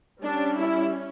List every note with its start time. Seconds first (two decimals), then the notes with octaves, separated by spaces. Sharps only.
0.21 G3 C#4 D4
0.58 E4